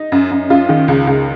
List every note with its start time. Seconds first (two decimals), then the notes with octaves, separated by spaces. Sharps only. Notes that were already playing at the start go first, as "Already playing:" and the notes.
Already playing: D#4
0.12 F#2
0.31 F#2
0.50 F#2 F4
0.69 D#3
0.88 C#2
1.07 C#2